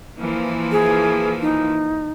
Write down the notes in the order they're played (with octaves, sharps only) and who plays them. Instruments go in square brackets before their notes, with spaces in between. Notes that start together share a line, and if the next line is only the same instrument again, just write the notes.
[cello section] E3 F3 A#3
[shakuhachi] G#4
D#4